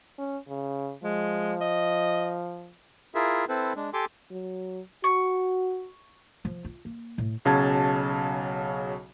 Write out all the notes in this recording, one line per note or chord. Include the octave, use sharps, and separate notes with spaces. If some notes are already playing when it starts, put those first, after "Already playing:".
C#4
C#3
F3 G#3
D#5
E4 F4 G#4 A#4 E5
C4 E4 A4 B4 C5
G#3 D4
G4 A4 G#5 C6 D6
F#3
F#4 C#6
F3
F4
A#3
A2
B1 C#3 F#3 A5 G#6